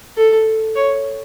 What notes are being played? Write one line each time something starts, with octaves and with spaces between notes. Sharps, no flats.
A4
C#5